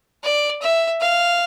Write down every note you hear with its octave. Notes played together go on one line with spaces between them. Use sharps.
D5
E5
F5